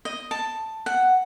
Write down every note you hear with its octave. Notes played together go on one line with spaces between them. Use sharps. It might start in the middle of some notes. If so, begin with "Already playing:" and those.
D#5
A5
F#5